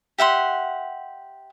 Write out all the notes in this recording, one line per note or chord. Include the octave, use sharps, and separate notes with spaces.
G4 E5 F#5 C6